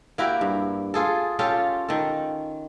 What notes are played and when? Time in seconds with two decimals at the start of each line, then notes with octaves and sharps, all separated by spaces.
0.18 A#3 E4 F#4 G4
0.41 G2
0.94 F4 G#4 A4
1.39 C#4 F4 G4 A4
1.89 D#3 A4